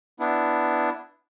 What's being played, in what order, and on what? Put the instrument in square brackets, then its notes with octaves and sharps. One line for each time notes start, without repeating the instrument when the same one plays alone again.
[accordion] B3 D4 E4